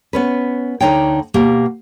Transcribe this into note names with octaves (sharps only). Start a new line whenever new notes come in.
B3 C#4 B4
D2 D3 D#4 C#5 G5
B2 A#3 G4